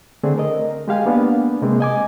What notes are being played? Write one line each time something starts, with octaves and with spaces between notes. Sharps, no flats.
D3 A3 C4 D4 G#4
A#4 D#5
G#3 G4 F5 G#5
A#3 B3 D4
C3 G#3 A#3 C4
D#5 G#5 D6